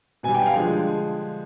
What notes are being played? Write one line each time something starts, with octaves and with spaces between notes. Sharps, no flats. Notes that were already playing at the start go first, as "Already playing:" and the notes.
B2 G3 G#5
G5
F5
D3 F3 G#3 G#4